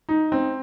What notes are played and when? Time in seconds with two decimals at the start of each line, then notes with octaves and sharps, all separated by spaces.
0.09 D#4
0.32 C4